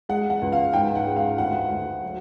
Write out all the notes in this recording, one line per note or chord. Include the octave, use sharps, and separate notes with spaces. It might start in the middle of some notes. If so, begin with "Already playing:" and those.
G#3 F#5
F#5
C#2
F5
G#2 G5
F#5
G#3
F5
D2 F#5
D2
F#3